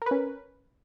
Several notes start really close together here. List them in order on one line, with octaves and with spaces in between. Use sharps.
A#4 B4 C#4